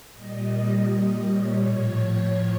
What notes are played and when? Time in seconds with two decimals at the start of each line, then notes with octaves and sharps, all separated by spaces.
0.13 A#2 G3 D#5
1.24 C#5
1.61 A2 F3 C#5